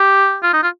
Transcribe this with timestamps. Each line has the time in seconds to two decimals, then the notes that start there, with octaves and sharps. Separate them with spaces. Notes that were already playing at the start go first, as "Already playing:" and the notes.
Already playing: G4
0.43 F4
0.53 D#4
0.63 F4